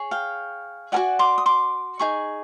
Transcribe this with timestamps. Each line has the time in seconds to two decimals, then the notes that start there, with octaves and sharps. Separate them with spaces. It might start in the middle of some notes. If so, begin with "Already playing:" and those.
Already playing: G#4 C#5
0.11 F5 G5
0.92 F#4 A#4 D5 F#5 G#5
1.19 C6 D6
1.38 D#6
1.46 C6 D6
1.99 D#4 G#4 C#6